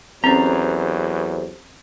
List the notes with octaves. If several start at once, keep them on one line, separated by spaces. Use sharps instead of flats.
E2 F#3 C4 C#4 G4 A4 C5 A#5